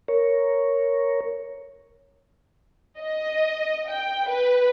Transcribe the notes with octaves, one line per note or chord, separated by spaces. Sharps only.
A#4 C#5
D#5
G5
B4